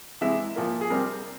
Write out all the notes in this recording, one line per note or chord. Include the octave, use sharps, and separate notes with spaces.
C3 E3 G#3 E5
A#2 F3 A#3
G#4
C3 G3 C4 A#4